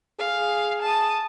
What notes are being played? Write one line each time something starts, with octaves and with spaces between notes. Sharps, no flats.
G#4 F5
A5 D#6